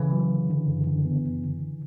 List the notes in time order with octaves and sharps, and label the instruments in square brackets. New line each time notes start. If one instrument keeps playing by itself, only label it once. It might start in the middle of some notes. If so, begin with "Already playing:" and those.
Already playing: [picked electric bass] C#3 E3
[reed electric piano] F#3
D3
D3
F#2
D3
B3
F#2
D3